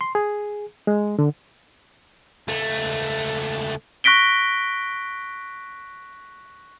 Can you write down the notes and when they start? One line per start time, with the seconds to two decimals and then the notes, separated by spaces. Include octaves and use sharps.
0.01 C6
0.15 G#4
0.87 G#3
1.19 D3
2.48 C#2 A3
4.04 C#6 F#6 A#6 B6 D7 G7